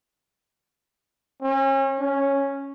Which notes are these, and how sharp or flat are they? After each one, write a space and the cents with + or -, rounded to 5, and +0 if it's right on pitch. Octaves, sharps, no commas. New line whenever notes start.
C#4 -35
C#4 -5